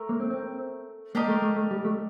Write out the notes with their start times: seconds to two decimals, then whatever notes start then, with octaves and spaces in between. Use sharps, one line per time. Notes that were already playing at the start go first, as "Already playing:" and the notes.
Already playing: A3 A#4
0.09 A#3
0.20 C4
0.30 C4
1.15 A#3 D4 G4 A#4 D#5
1.28 A3
1.42 A3
1.56 A3
1.71 G3
1.85 A3